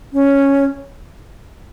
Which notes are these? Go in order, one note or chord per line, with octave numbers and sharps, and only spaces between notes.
C#4